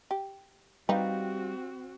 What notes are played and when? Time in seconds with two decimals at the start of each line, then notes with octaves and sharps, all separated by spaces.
0.11 G4
0.89 G3 C4 D#4 F#4 G4 B4 F5